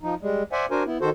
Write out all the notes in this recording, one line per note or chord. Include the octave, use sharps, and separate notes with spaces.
F3 D#4
G3 G#3
C5 D5 E5 F#5 G#5
D4 F#4 A#4 C5 G#5
B3 E4
D#3 F#4 A4 C5